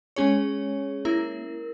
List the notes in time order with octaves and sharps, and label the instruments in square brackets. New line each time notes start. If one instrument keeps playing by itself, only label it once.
[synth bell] G#3 C#4 G#4 C#5
A#3 E4 A#4